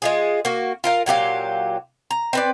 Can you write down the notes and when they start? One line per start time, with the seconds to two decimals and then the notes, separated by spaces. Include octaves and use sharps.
0.02 G#3 F4 G#4
0.45 A#3 F#4
0.84 F4 A#4 F5
1.06 A#2 F#3 G4 F5
2.11 A#5
2.33 C4 B4 D5